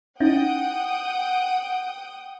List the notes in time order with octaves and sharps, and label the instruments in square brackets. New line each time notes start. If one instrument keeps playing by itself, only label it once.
[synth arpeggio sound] C#4 D#4 E4 [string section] F#5 G5 D#6